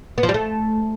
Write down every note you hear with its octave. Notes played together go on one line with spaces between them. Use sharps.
B3
F3
G3
A3